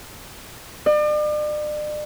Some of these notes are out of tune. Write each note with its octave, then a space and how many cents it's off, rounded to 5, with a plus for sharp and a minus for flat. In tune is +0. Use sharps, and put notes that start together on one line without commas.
D5 +40